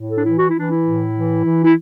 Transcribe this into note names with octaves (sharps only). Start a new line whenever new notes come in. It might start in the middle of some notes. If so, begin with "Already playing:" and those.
Already playing: A2
A4
D4
E3 E4
F#4
E3 E4
D4
E4
A2
E3
E3
E4